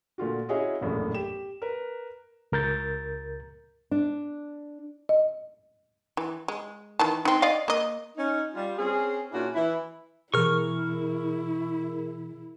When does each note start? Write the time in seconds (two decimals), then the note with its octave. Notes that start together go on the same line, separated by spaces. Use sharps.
0.18 A#2 D3 F4 F#4
0.49 C#4 E4 F#4 G#4 C#5 D#5
0.81 E1 A#1 F#2 A2
1.14 G4 E7
1.62 A#4 B4
2.52 C#2 A#4 G6 A6
3.91 D4
5.09 D#5
6.17 E3
6.48 G#3
6.99 D#3 E3 A5
7.25 C4 D#4
7.42 D5 D#5 F5
7.68 A#3 D#5
8.16 C#4 D#4
8.54 G3 F4
8.78 C4 C#4 G#4
9.32 A#2 C#4 D4 E4 F#4
9.55 E3 E4
10.34 B2 E3 E4 G#4 A#4 C#6 F6